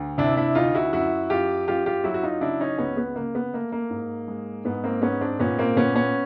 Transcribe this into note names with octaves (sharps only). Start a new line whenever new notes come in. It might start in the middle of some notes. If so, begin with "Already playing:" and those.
Already playing: D2
C3 D4 E4
D4 E4
D2 D#4 F4
E4 F#4
F#2 E4 F#4
F#2 F4 G4
F#2 F4 G4
F4 G4
F#3 E4 F#4
F#4
D#4 F4
C#3 D4 E4
C#4 D#4
C#2 B3 C#4
B3
C#3 A#3
B3
A3 A#3
A#3
G#2
G#3
G#2 B3
A#3 C4
G#2 B3 C#4
C4 D4
A#2 B3 C#4
A#3 C4
A#2 B3 C#4
B3 C#4